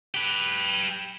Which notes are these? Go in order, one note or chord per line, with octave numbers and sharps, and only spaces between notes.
G4 B4